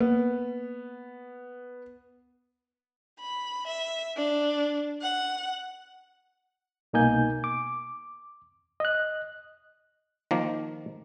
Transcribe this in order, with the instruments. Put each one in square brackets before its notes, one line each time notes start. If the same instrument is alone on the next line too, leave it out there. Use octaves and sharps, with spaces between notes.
[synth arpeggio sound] A#3 [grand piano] B3
[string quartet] B5
E5
D4
F#5
[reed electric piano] C2 B2 A#3 D#4 G#5 G6
D6
D#5 F#6
[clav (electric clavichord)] D#3 F3 A#3